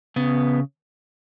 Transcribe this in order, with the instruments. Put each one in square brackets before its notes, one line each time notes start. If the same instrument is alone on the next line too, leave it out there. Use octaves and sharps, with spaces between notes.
[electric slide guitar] C#3 B3